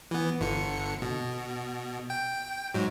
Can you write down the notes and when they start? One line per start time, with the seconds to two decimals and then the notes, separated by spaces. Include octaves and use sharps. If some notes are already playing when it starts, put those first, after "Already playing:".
0.11 E3 B3
0.41 G1 D3 C#7
1.02 B2
2.10 G5
2.74 G#2 F#3